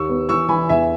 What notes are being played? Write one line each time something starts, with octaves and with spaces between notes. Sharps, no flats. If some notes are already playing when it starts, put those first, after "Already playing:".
Already playing: D#2 C#6 E6
B3
E3 C#6 E6
E3 G#5 B5
E2 E5 G#5